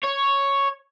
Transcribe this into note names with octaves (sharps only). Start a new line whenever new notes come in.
C#5